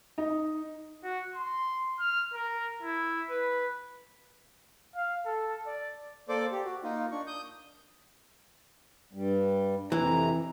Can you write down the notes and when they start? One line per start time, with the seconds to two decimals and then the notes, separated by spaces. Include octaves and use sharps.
0.18 D#4
1.04 F#4
1.35 C6
2.00 F6
2.34 A#4
2.83 E4
3.30 B4
4.96 F5
5.26 A4
5.66 D5
6.29 A#3 A4 C5 D5 D6
6.52 G4
6.64 F#4
6.84 A#3 D#4 F4
7.12 D4 C#6
7.27 D#6 G6
9.13 G2 G3
9.92 F2 C3 E3 A#5